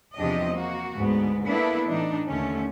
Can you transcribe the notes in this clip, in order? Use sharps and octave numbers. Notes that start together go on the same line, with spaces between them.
E2 C3 F3 D4 G4 D#5
A#3 F#4
D2 G#2 B3
A#3 B3 D4 E4 A4 B4
A2 E3 D4 D#4
D#2 D3 A3 C#4